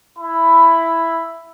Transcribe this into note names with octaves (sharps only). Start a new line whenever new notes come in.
E4 B5